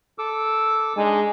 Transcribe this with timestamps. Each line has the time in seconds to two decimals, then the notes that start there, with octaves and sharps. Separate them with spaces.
0.18 A4 D6 E6
0.97 G#3 D4 D#4 G#5